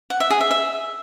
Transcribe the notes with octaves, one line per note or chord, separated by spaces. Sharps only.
F#5
E5
G#4
E5
E5